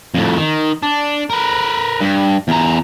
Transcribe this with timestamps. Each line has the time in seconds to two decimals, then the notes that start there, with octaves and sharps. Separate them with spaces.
0.14 F2 A2
0.37 D#3
0.83 D4
1.30 A#4 B4
2.01 G2
2.48 E2 A#5